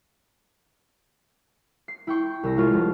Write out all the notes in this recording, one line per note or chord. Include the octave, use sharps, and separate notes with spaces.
C7
E4 G5 C#6
C2 E6 A#6
G#3 F4 C#5
F1